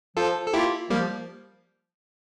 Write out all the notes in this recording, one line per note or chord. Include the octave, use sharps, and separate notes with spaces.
F3 F4 A4
A4
A#3 E4 F4 G4
F3 G3 A#3